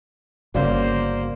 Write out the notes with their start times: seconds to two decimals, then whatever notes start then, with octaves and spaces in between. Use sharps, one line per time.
0.55 G1 C#3 A#3 F#4 C5 D5 F5